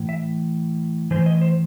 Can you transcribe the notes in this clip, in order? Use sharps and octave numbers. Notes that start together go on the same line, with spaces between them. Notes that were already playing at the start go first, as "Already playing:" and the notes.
Already playing: A2 E3
E5
A2 E3 C5
D#5
C5